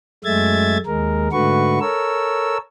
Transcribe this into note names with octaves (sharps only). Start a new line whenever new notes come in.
F#2 G#3 A3 E5 G#6 A6
D#2 G#3 A#4
G#2 D3 A3 F#4 B4 C#6
A4 A#4 C#5 E6